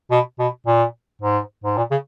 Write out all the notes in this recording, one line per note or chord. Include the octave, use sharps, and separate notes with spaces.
B2
B2
A#2
G#2
G#2
A#2
C#3